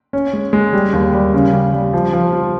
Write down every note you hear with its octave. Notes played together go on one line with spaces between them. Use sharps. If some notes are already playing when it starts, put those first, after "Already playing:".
C#4
G#3
G#3
G3
D#2
G3
C#3
G3
G3
F3
F3
F4